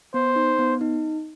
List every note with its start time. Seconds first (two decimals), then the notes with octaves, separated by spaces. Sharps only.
0.14 B3 C5
0.36 D#4
0.59 B3
0.81 D#4